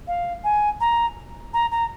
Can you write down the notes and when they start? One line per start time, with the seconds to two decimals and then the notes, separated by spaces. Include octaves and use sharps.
0.08 F5
0.44 G#5
0.81 A#5
1.54 A#5
1.72 A#5